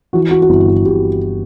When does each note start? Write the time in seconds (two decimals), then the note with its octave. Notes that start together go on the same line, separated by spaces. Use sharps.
0.13 E3 F#4
0.31 F#4
0.42 F#4
0.49 G1 E4
0.67 F#4
0.85 G1 G4